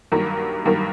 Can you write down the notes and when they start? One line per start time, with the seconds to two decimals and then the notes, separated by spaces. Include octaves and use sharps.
0.12 G2 D#3 F#3 A#3
0.65 G2 D#3 F#3 A#3